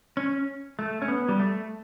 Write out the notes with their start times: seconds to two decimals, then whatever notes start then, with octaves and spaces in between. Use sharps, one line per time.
0.17 C#4
0.79 A3
1.02 C#4
1.08 B3
1.29 G3
1.39 A3